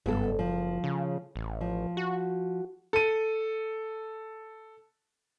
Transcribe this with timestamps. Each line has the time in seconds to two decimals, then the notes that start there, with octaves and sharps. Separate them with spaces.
0.06 F#1 G2 B3 A4
0.39 F3
0.84 C#3
1.36 A1
1.61 F3
1.97 F#4
2.93 A4 D#7